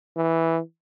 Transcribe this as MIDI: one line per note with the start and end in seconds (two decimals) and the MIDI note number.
0.16 0.59 52